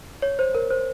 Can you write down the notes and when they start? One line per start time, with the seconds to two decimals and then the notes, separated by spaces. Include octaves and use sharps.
0.22 C#5
0.39 C5
0.55 A#4
0.70 C5